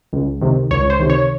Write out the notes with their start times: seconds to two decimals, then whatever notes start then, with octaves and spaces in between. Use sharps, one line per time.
0.13 C#2
0.42 C3 D#3
0.71 C#2 C#5
0.90 C5
1.00 C3 D#3
1.10 C#5